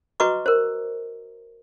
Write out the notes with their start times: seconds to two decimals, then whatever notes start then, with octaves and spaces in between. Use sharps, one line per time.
0.20 F#4 B4 D#5 A#5 C#6 D6
0.46 A#4 C5